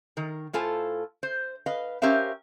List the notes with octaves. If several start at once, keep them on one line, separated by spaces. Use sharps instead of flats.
D#3 A#4
A2 F4 A4 C5 G#5
C5
B4 D#5 F5
C#4 G4 A#4 C5 E5 F5